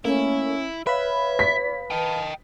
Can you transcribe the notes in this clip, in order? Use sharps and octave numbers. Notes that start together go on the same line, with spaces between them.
A3 A#3 C#4 E4
B4 C#5 E5 F5 B5
B6
D#5 G5 A5